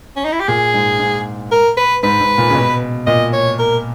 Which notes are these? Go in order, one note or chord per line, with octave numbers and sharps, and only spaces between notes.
C#4
D#4
E4
G4
A#2 G#4
G#2
G#2
A#4
B4
G#2 B4
G#2
A#2
C#3
B2
A#2 D#5
C#5
A#4